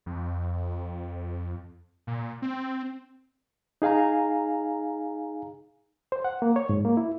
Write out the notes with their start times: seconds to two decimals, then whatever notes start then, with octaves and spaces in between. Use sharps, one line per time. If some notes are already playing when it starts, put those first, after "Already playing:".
0.06 F2
2.07 A#2
2.42 C4
3.82 D#4 G#4 F5 G#5 A#5
6.12 C5
6.25 F#5
6.42 A#3
6.56 C#5
6.69 G#2
6.85 A#3
6.97 E4